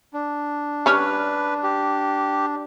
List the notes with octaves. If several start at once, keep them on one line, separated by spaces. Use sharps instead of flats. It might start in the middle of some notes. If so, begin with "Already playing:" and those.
D4
G3 C#4 B4 C#5
G4